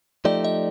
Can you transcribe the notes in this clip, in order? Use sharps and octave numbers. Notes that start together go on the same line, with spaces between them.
F3 A3 D#4 G4 D5
D#5